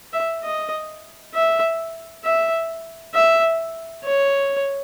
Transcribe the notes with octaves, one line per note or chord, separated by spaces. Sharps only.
E5
D#5
E5
E5
E5
C#5